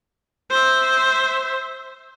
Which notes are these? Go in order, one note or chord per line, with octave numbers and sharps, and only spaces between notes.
C5 E5